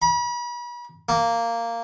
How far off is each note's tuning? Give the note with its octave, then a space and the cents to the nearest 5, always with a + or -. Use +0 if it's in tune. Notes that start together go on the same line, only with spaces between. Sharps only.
B5 -40
A#3 -10